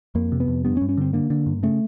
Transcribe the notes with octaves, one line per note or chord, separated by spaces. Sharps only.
F2 A#3
C3
B3
F2
G2 B3
C#4
G2
C#4
D3 C4
D3 A#3
D3
G2
C#3 A3